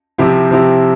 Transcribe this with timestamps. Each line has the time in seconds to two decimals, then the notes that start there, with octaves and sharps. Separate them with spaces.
0.18 C3 F3 C4 E4 G4
0.51 C3 F3 C4 E4 G4